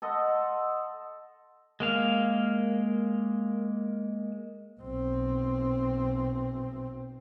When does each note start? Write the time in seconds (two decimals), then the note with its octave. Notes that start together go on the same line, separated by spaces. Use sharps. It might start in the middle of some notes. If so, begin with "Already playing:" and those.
0.02 A4 D#5 F#5 C6
1.80 G#3 A#3 F5
4.80 B1 C4